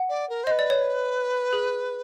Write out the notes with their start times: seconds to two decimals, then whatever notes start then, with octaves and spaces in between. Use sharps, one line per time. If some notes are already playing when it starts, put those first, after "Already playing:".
Already playing: F#5
0.09 D5
0.29 A#4
0.43 C5
0.47 B4 D#5
0.59 D5
0.70 C#5
1.53 G#4